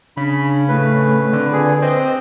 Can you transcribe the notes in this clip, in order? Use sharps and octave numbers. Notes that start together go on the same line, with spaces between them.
C#3 D4 B5
A2 A3 B4
D3 C4
A#2 G#4 B4
C4 D#5